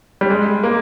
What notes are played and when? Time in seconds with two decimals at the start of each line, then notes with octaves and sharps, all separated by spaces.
0.21 G3
0.30 G#3
0.63 A#3